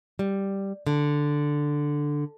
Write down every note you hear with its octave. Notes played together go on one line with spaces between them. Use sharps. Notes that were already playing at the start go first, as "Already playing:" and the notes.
G3
D3